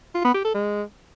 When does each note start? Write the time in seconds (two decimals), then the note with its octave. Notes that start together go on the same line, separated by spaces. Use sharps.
0.15 F4
0.24 B3
0.34 G4
0.44 A4
0.54 G#3